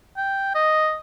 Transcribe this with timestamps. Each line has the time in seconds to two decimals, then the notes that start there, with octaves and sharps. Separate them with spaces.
0.17 G5
0.55 D#5